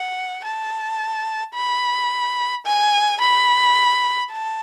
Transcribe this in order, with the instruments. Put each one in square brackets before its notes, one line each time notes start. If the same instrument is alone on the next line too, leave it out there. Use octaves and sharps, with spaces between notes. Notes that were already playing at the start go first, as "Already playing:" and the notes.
Already playing: [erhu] F#5
A5
B5
G#5
B5
A5